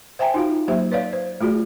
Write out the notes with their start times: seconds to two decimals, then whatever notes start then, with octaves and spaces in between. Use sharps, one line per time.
0.19 C5 E5 G5 G#5 A#5
0.34 D#4 F4 F#4 F5
0.68 F#3 A#3 G4 C5 E5
0.92 B4 C#5 D5 F5
1.13 C5
1.41 A3 F4 F#4 G#4 D5